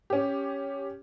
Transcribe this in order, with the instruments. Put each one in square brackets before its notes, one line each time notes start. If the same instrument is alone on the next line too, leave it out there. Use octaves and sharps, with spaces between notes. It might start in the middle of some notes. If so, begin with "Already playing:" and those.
[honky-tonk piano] C#4 G4